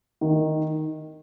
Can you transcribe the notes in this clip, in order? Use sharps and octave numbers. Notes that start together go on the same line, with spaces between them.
D#3